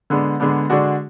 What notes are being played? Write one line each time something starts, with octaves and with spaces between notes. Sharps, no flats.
D3 G#3 B3 D4
D3 G#3 B3 D4
D3 G#3 D4 F#4